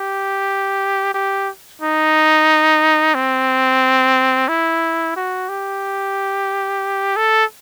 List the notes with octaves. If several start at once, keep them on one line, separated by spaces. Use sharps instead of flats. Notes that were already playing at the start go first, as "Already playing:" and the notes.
Already playing: G4
G4
D#4
C4
E4
F#4
G4
A4